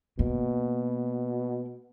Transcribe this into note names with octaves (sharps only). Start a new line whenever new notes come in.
B2 A#3